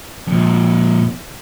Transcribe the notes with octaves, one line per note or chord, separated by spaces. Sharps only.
F2 A#2